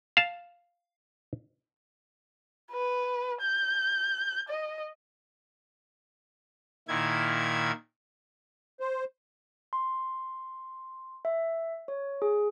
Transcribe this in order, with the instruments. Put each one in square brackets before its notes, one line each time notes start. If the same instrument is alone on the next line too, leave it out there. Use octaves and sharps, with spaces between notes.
[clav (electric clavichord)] F5 A5
[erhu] B4
G6
D#5
[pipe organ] A#2 D#3 E4 G#6
[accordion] C5
[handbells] C6
E5
C#5
G#4